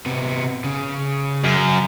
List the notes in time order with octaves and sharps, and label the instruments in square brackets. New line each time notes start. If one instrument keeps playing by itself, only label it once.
[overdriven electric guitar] C3 B3
C#3
[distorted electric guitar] F#2